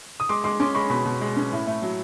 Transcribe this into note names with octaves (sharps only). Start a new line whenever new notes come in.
D#6
G#3 C6 D6
G#3 C6 D6
C#4 C6 D6
G#3 B5 C#6
B2 B5 C#6
B2
G#3
C#4
A2
A3
F#3